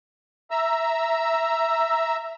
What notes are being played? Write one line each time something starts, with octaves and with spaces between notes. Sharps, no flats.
E5 A#5 E6